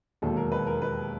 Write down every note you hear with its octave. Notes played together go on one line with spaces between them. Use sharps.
E1 D#2 D#3 F#3 A4
A#4
B4
A#4
B4